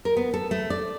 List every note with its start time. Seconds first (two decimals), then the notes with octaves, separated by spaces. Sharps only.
0.05 A#4
0.17 B3
0.34 A4
0.51 A3
0.70 D5